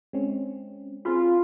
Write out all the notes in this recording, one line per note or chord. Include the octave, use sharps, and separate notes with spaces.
G#3 C4 C#4
C4 F4 G#4 B5